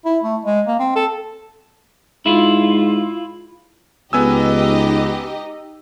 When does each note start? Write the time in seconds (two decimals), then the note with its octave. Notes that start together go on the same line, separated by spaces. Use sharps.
0.05 E4
0.23 A3
0.45 G#3
0.67 A#3
0.79 C4
0.96 A4
2.26 G#2 E4 F4
4.13 C#2 B3 D#4 G4 D#5 G#5 E6